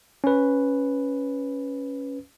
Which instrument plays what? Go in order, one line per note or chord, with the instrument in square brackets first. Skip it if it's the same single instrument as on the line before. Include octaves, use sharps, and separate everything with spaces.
[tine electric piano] C#4 B4